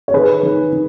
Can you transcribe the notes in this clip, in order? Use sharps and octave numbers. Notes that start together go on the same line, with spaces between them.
C#5
D#3 G#4 B4
D#3
D#3